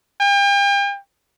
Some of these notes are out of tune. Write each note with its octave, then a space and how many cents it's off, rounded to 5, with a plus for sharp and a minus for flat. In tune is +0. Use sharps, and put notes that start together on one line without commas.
G5 +40